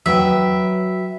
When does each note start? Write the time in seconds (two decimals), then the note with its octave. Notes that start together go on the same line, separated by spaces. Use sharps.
0.06 F#3 B4 E5 G5